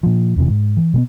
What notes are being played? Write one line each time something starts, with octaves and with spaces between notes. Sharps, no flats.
A#2 F3
E1 E2 C3 E3
G#2
E3
B2 A3 B3